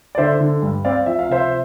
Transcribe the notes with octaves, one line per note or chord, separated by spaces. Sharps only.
D5
D3 C5 E5
D3
G2
C4 D5 F5
F3 E5
F5
C3 C5 E5